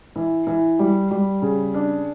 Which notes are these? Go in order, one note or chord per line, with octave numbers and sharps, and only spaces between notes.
E3
E3
G3
G3
C#3
D4